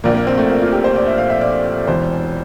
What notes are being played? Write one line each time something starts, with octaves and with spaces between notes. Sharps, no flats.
A#1 A#2 A#3
A#3
C4
A3
A#3
F4
G4
C5
D5
E5
F5
E5
D5
E1 E2 E3 C5